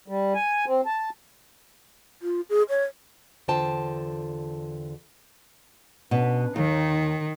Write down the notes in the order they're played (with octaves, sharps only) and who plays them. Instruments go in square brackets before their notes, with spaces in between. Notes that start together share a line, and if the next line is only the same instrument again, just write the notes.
[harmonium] G3
G#5
C4
A5
[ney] F4
G#4
C#5
[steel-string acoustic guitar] E2 D3 F4 C5 G5 A5
[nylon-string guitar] B2 [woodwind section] C#4 D4 B4
[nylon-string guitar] D#2 [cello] D#3 [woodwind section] D#4